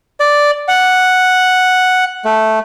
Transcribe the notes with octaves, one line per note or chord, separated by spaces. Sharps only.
D5
F#5
A3